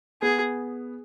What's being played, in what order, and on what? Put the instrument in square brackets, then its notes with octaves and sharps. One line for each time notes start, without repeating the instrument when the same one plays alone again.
[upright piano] B3 [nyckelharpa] G#4